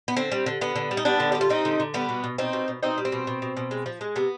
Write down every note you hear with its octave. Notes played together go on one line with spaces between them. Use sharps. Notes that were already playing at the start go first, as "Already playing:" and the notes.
B3
D3 C4
G3
D3
D3 B3
D3
G3
D#4
G3 B3 D4
D3
G3 G4
F4
G3 C4 D#4
D3
D3
G3 B3 D4
B2
B2
B2 C4 D#4
B2
B2
B2 C4 D#4
G3
C4
B2
B2
B2
B2
G#3
F3
G#3
C3 B3